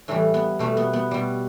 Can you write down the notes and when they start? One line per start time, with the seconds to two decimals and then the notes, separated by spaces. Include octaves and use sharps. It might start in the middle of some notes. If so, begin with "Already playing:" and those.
0.08 A2 E3 G3 A3
0.34 B3
0.59 B2 G3 A3
0.77 B3
0.93 B3
1.11 B2 G3